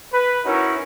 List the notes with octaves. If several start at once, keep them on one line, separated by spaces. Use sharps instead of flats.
B4
C#4 D#4 E4 F#4 A#4